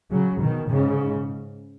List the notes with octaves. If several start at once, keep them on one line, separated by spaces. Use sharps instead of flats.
C#3 F#3
B2 D#3
G#2 C#3